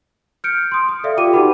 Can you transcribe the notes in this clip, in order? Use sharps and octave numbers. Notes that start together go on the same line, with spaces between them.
F6 G6 C#7 D7
C6 D#6
D#6
A4 D5 E5 F5
F4 G4 G5 D6 D#7
D#4 F#4 B4 F#5 B5